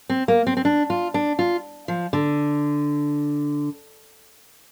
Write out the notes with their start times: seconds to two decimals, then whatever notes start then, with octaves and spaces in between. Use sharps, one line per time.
0.10 C4
0.28 A#3
0.47 C4
0.57 C4
0.65 D4
0.90 F4
1.14 D4
1.39 F4
1.88 F3
2.13 D3